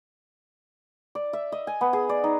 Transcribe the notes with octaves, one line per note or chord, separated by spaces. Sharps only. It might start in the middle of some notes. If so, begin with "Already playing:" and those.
D5
E5
D#5
G#5
B3
G#4
D5
D#4